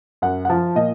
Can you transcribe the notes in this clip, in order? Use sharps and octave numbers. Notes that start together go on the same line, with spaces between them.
F#2 F#5
F#5
F3 A5
A#2 D#5